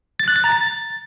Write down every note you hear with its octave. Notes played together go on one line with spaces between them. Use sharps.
A6
F#6
A6
A#5
A6